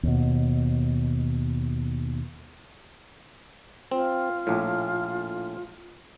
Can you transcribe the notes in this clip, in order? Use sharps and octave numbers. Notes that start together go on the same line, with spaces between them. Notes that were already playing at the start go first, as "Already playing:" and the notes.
D#2 B2
C4 F4
A#1 A2